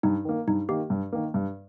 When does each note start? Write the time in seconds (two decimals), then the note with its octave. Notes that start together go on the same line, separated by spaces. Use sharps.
0.03 G2 D#4
0.25 D#3 A#3
0.48 G2 D#4
0.69 D#3 A#3 G4
0.90 G2
1.13 D#3 A#3
1.34 G2